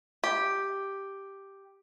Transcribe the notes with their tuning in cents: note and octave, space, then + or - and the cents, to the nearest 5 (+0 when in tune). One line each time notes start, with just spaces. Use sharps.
G4 +0